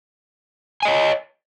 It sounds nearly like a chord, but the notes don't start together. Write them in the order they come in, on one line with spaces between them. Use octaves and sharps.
G#5 D#5 C#5